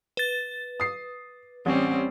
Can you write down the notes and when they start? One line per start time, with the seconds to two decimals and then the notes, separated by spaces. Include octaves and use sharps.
0.17 B4 A6
0.80 D#6 C7
1.66 A1 G3 C4 C#4